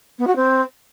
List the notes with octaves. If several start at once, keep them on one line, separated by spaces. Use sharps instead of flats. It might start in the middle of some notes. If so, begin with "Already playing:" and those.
B3
F#4
C4